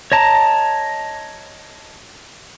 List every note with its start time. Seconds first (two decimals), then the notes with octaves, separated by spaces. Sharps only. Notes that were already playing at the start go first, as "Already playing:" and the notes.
0.12 C#5 D#5 A5 A#5